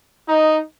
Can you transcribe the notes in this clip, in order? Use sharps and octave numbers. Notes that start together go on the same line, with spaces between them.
D#4